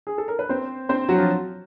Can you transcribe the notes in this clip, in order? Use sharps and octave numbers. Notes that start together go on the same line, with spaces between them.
G#4
A4
A#4
B4
C4 C5
C4 C5
F#3 F#4
F3 F4